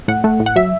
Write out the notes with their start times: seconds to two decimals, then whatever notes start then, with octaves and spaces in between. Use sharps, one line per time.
0.08 A2 F#5
0.24 A3
0.40 A2
0.46 F#5
0.56 F#3 E5